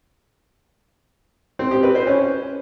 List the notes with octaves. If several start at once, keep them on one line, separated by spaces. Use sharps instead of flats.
C4
G4
B4
C5
C#4